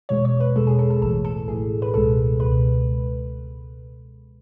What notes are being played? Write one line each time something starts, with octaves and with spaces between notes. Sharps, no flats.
E2 B2 G#3 C#5
C#5
B4
E2 B2 G#3 A4
G#4
A4
A4
A1 A2 E3 A4
A4
A1 A2 E3 G#4
B4
C#2 B2 G#3 A4
C#2 B2 G#3 B4